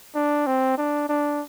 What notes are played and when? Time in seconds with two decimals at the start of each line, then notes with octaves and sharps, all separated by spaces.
0.15 D4
0.47 C4
0.78 D4
1.09 D4